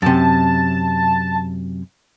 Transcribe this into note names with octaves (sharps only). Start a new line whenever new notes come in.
F#2 C3 A5